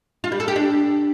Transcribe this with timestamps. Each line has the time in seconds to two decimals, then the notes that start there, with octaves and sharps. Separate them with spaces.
0.24 F4
0.32 G3
0.40 A4
0.48 G4
0.56 D4